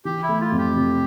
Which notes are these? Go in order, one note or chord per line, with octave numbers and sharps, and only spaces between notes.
E3 G4
E4
A3
F4
F2
G4
C3